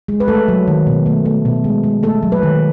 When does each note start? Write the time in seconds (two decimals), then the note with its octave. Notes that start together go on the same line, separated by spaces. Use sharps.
0.08 G#3
0.20 B4
0.28 A3 A4
0.48 F#3
0.68 D#3
0.87 B2
1.06 A3
1.25 A3
1.45 B2
1.64 G#3
1.84 G#3
2.03 A3 A4
2.23 F#3
2.32 B4
2.43 D#3